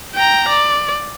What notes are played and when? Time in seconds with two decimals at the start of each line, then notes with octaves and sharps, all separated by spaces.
0.15 G5 A#5
0.49 D5